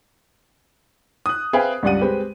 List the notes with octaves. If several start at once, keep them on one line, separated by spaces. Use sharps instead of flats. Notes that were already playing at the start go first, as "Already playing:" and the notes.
D#6 F#6
C4 G#4 B4 E5 F5 G5
C#2 G2 G3 D5 F#5 D#7
G#3 C4 G4 B4